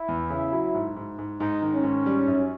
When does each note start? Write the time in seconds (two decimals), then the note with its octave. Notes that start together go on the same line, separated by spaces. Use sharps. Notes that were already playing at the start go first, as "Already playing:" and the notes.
Already playing: E4
0.08 E2
0.30 C#3
0.53 F#3
0.74 G#2
0.96 G#2
1.19 G#2
1.40 G#2 D#4
1.62 D#3
1.73 C#4
1.84 G#2
2.06 G3
2.28 F#2